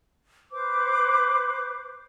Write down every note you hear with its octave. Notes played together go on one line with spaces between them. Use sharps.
B4 C5 D6